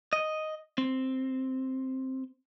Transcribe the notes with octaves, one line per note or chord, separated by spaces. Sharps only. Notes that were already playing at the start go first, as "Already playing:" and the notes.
D#5
C4